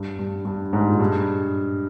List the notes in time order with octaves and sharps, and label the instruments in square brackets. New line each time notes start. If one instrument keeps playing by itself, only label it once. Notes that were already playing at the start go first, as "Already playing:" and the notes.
Already playing: [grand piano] G2
G2
G2
G#2
A#2
G2